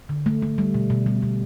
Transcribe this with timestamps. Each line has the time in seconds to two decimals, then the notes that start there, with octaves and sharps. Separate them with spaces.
0.09 D3
0.26 A3
0.42 A3
0.58 G3
0.74 B2
0.90 B2
1.06 G3
1.23 B2